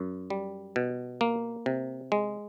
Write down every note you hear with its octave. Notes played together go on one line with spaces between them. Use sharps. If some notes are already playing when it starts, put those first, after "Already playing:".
Already playing: F#2
G3
B2
A#3
C3
G#3